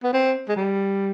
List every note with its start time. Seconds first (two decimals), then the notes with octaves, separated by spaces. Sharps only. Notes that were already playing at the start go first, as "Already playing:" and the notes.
0.03 B3
0.13 C4
0.49 G#3
0.56 G3